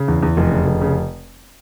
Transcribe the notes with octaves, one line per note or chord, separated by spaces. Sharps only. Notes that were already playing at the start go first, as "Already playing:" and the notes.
Already playing: C#3
E2
E2
F1
C#3
F1
C#3